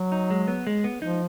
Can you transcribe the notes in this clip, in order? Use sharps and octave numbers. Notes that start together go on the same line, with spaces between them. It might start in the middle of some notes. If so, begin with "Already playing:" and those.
Already playing: F#3
D#4
G#3
B3
G#3
B3
F3 D#4